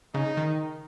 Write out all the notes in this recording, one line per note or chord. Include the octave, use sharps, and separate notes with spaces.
C#3 D#4
D#3